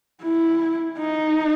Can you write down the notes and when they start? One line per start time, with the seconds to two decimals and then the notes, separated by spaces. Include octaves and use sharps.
0.23 E4
0.99 D#4